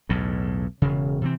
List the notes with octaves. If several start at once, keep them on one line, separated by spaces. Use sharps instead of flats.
B1 E2 A2
E1 C#3
C3 E3 C4